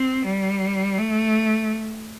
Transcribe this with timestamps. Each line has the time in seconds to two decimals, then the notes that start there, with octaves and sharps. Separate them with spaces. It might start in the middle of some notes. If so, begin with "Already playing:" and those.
Already playing: C4
0.25 G3
0.98 A3